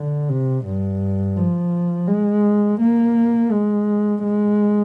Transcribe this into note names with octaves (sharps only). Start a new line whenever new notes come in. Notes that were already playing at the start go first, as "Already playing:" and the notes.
Already playing: D3
C3
G2
F3
G#3
A#3
G#3
G#3